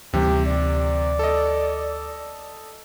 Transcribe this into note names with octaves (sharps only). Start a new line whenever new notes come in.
D2 C3 E3 G3 G4
D5
A4 D#5